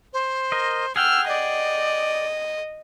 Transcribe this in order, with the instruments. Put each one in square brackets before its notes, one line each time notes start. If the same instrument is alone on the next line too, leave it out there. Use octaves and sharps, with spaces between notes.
[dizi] C5
[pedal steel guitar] A#4 D#5
[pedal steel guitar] G#4 F#5 G5 [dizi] E6 [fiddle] F6
[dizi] D5 [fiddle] D#5